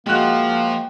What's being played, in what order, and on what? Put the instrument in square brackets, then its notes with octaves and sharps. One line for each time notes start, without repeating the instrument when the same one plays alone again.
[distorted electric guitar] F3 [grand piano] G#3 F#4 F#6 [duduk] A#3 [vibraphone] G5